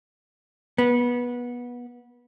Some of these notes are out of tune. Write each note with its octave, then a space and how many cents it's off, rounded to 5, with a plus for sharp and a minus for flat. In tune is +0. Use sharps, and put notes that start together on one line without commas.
B3 -20